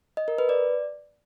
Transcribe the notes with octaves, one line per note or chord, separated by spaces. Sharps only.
D#5
A#4
B4
D5